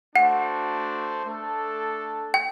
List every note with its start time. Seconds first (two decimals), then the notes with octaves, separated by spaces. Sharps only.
0.16 A3 D4 F#4 C5 F#5
1.24 A3 D4 A4
2.34 G5